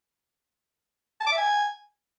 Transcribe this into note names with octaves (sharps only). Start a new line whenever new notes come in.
A5
D6
E5
G#5